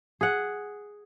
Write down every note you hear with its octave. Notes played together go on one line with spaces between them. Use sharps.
G#4 F#5